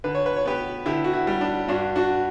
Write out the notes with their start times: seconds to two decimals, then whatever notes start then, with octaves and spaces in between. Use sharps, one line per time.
0.04 D3 B4
0.15 C#5
0.26 B4
0.36 C#5
0.45 B3 G4 B4
0.86 D3 E4 G4
1.04 F#4
1.13 E4
1.27 G3
1.41 D4
1.68 G2 D4 F#4
1.96 D4 F#4